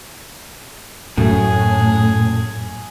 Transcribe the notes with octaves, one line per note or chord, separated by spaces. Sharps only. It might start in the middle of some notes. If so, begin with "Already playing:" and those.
F#2 A2 A3 G#4